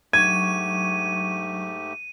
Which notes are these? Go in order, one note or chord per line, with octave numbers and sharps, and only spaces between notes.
G#2 F#3 A3 D4 G4 C#6 G#6 D#7